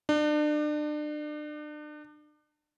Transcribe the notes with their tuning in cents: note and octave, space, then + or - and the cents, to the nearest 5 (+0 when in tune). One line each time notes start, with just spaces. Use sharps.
D4 +35